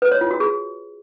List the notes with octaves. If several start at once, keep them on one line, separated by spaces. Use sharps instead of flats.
B4
C#5
F4
F#4
G#4